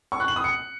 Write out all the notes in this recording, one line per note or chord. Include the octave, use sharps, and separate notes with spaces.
C#6
F#6
F#7
D#6
C#7